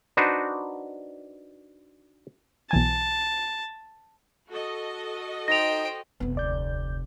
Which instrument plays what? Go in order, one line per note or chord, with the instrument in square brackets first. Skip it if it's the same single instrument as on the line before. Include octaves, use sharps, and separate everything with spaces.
[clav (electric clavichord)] D4 D#4 F#4 B4 C5
[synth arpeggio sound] B1 E3 G#5 [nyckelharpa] A5
[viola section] F#4 A4 D#5
[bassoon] D#4 [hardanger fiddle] C5 G5 [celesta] A#6 F7
[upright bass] F1 C3 [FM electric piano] B3
[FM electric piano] D2 D5 G6